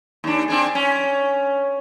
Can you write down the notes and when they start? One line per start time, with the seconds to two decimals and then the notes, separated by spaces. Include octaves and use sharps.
0.24 D#2 D4
0.48 C4 D4 G#4
0.75 C#4